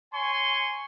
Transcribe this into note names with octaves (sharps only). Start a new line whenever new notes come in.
C#5 G#5 C6 C#6